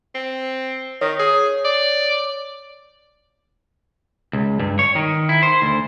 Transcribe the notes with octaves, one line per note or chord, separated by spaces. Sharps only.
C4
D#3 C#5
G#4
D5
C#2
G2
C#5
D#3
E4
C5
D2